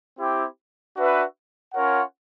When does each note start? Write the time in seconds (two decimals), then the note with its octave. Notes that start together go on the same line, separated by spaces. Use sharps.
0.17 C4 E4 G4
0.95 D4 F#4 B4 E5
1.74 C#4 F4 A#4 C#5 F#5